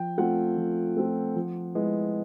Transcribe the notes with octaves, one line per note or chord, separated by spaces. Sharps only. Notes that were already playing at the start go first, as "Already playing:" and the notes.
Already playing: F3 G5
A3 C4 F4 F#5
F3
A3 C4 F4
F3
G#3 B3 E4